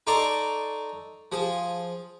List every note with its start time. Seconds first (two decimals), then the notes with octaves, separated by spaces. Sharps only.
0.07 D#4 A4 D5 A#5 C6 C#6
1.32 F3 G#4